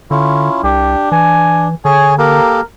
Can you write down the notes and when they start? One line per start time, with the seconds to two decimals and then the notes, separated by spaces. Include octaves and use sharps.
0.11 D3 C#4 E4 F4
0.64 C2 D4 G4
1.12 E3 G#5
1.85 D3 G#4 C#5 G#5
2.18 A#3 G4 A4 A#4